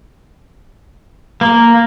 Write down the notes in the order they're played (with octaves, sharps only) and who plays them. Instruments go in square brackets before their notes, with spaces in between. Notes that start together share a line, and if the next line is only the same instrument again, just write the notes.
[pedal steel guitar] A#3